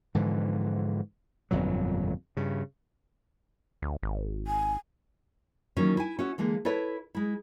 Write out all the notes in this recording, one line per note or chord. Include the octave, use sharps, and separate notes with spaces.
G#2 D3 E3 F3
G1 F2 A#2 F#3
G2 C#3
D2
G#1
G#5
D#3 E3 F#3 A#3 C#4 E4
E4 G#5
C#4 F#4 E5
D3 E3 G#3 A#3
E4 A4 B4 C#5 E5
G#3 E4